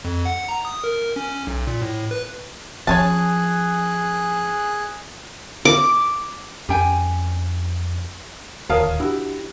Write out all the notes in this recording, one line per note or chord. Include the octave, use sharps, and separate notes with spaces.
F2
F#5
A#5
D#6
A#4
C#4
B1
A#2
A2
B4
F3 C#4 G#4 C#5 G#5 A5 F#6
D6
F2 C#4 G4 G5 G#5
D1 D#2 A#4 C#5 F5 A5 D#6
D4 E4 F#4 G4